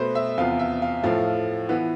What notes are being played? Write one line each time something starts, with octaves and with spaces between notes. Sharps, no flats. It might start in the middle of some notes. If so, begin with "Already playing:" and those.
Already playing: B2 A3 B4 C5
E5
E2 C3 F3 B3 F5
E5
F5
A2 F3 A3 F5
E3 B3